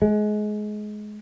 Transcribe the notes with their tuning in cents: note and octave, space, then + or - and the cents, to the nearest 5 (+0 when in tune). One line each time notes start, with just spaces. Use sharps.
G#3 +25